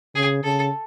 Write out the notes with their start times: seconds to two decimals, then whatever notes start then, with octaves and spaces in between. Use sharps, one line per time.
0.15 C#3 G#4
0.43 C#3 A4